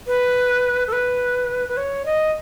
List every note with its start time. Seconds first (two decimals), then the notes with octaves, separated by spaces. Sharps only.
0.07 B4
0.87 A4
0.92 B4
1.68 B4
1.77 C#5
2.06 D#5